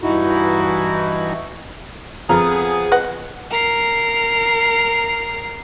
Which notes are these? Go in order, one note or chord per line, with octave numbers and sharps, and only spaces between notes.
G2 E3 D#4 E4 F#4
F2 B3 F4 G#4 A4 A#5 F6
B4 D#5 F#5
A#4 C7